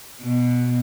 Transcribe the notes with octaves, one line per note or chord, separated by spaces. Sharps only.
B2